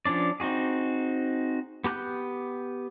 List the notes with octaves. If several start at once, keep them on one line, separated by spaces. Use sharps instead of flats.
F3 C#4 D4 D5
C4 D#4 F#4 G#4
B3 G4 A#5 F#6 G6